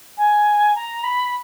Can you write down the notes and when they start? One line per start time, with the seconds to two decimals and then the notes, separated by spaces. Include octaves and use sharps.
0.17 G#5
0.75 A#5
1.04 B5